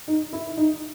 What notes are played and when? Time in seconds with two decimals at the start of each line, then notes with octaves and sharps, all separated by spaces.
0.08 D#4
0.33 E4
0.57 D#4